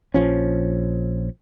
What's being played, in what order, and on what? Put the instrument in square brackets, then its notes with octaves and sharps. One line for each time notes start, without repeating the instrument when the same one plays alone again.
[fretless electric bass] A#1 F3 C#4